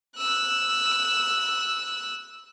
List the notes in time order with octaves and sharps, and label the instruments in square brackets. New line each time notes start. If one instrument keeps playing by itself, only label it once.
[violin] E6 F#6